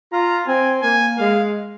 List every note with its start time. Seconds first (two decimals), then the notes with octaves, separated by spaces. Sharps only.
0.12 F4 A#5
0.47 C4 G#5
0.82 A#3 G#5
1.18 G#3 F5